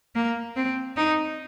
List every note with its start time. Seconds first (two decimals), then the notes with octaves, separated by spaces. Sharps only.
0.15 A#3
0.56 C4
0.96 D#4